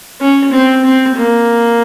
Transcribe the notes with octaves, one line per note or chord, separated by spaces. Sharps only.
C#4
C4
C4
A#3